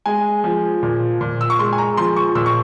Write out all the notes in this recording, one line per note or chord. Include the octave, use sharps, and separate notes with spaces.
G#3 G#5
F3
A#2
A#2
E6
C#6
G#3 C6
G#5
A#5
F3 C6
C#6
A#2 E6
C#6